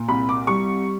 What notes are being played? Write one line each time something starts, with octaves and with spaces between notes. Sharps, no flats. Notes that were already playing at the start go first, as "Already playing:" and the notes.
Already playing: A#2
C2 B5
D6
G3 C#6